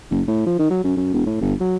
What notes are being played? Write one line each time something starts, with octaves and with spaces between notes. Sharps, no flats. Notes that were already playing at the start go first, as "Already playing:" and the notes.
F#1
A2
F3
D#3
F#3
F#2
F#2
E1
A2
G1
F#3